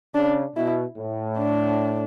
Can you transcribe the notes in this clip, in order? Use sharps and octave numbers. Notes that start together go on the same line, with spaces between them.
C#3 D4
B2 E4
A2
D4